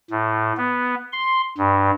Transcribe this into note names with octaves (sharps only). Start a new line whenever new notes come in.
A2
B3
C6
G2